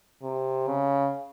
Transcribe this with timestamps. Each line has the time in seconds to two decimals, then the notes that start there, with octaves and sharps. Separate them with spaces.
0.22 C3
0.67 C#3